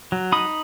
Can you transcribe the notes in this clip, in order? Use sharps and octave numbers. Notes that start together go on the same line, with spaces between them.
F#3
D#4 B5 D#6